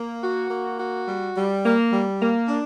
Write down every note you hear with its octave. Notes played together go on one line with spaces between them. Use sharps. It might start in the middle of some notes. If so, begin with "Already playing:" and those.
Already playing: A#3
F#4
A#3
F#4
G3
G3
A#3
G3
A#3
D4